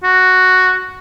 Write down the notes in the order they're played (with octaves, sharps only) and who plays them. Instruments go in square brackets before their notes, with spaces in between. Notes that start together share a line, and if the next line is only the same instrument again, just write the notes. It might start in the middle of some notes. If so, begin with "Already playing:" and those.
[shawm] F#4